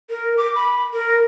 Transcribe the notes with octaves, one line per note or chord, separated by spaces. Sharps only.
A#4
D6
B5
A#4